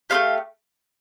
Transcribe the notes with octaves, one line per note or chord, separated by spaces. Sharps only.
A3 C4 G4 F5